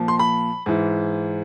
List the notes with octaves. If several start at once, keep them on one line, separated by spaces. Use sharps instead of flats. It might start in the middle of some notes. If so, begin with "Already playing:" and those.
Already playing: A#2 F3
C6
B5
G#2 E3